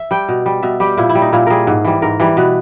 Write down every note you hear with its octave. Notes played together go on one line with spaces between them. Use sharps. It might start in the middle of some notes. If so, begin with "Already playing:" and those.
Already playing: E5
G3 G5
B2
G3
B2 E5
G3 G4
A#2 E4
E4
G3
D#4
A#2 E4
G3 G#4 A#4
G#2
E3 G3
G#2 A#4
E3 G3
B2 B4